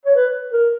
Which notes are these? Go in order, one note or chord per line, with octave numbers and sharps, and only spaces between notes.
C#5
B4
A#4